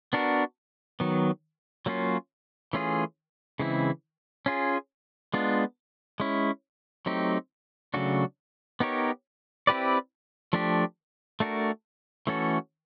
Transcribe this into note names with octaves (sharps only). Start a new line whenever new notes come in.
B3 D4 F#4 A#4
D#3 F#3 B3
F#3 A#3 C#4 F4
E3 A3 C#4 F4 G#4
C#3 E3 G#3 C4 E4
C#4 F4 G#4
G#3 B3 D4 F4
G#3 C#4 E4
F#3 A3 C4 D#4 G4
C#3 F#3 A3 D4 F#4
B3 D#4 G4 A#4 C#5
C4 E4 G4 B4 D5
F3 A3 D4 G4
A3 D4 F#4 A#4
E3 A3 C#4 F#4 A4